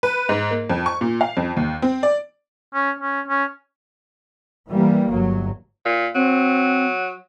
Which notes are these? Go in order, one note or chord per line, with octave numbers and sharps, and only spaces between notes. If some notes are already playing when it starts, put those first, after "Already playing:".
B4
G#2
A#3
F2
C#6
A#2
F5
F2
D#2
C4
D5
C#4
C#4
C#4
E3 G3 A#3
G1 F#3
A#2
F#3 C4